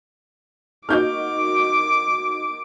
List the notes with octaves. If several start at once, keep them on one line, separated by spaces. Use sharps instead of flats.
A#3 D#4 F#4 D6 F6 G6